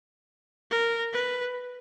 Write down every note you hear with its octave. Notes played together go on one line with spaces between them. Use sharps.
A#4
B4